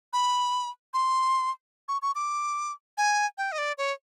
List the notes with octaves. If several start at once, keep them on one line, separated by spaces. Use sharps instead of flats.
B5
C6
C#6
C#6
D6
G#5
G5
D#5
D5
C#5